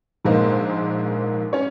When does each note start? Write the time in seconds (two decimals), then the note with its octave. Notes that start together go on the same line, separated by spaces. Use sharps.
0.25 A#1 G#2 G#3 A#3 C5
1.53 C#4 C#5